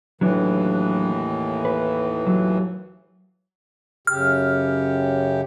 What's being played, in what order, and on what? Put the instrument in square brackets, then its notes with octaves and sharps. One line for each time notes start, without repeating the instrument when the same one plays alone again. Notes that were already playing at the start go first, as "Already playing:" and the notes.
[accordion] D#2 A2 E3 [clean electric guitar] F#3 D4
[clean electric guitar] B4
F#3
[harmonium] F#2 C#3 G4 [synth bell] F6